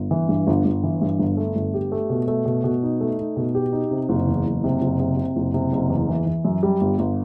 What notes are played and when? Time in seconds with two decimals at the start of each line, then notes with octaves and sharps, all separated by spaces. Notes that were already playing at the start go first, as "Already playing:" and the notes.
Already playing: G1
0.11 E3
0.29 G2
0.47 G1
0.65 G1
0.83 E3
1.01 G2
1.19 G1
1.37 A3
1.56 G1
1.74 G4
1.92 A3
2.10 B2
2.28 A3
2.46 B2
2.64 B2
2.83 D#4
3.00 A3
3.19 D#4
3.37 B2
3.55 G4
3.72 D#4
3.91 C3
4.09 F#1
4.27 E2
4.45 F#1
4.64 C3
4.82 F#1
5.00 C3
5.17 C3
5.36 F#1
5.54 C3
5.72 F#1
5.90 E2
6.09 E3
6.26 E3
6.45 F#2
6.63 G3
6.81 G1
6.99 G1